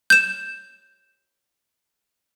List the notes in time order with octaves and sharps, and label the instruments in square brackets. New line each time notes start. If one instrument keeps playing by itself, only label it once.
[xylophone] G6 E7